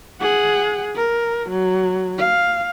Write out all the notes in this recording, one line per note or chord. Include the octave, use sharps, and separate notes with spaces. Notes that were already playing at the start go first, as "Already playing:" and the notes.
G#4 F#5
A#4
F#3
F5